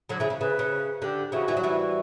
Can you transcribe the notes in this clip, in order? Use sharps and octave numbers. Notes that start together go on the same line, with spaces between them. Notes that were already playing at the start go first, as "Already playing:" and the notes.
D3 F#3
C#3 E3
C#3
C#3 B4
C#3
D3 G4
C#3 E3 F#4
E3 G3
F#3
E3 G3